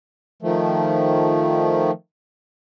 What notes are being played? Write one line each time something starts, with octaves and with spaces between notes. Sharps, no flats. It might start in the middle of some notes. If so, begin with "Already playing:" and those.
D#3 F3 A3